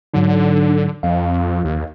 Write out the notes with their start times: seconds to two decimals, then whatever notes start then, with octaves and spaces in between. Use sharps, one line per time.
0.14 G#2 D3 F#3 D#4
1.03 F2 F5
1.65 D#2